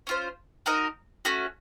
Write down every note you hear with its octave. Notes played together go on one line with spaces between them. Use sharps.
C#4 F4 C5
D#4 F#4 A#4 D#5
A3 C#4 F#4